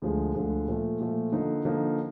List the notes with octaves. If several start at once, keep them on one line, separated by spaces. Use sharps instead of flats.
D2 D3 F3 G#3
D2 D3 F3 G#3
A#2 F3 A3
A#2 F3 A3
D3 F3 A#3 D#4
D3 F3 A#3 D#4